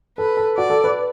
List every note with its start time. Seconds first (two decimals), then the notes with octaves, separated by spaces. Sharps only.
0.18 A4 B4
0.37 A4
0.57 F#4 D5
0.70 A4
0.84 B4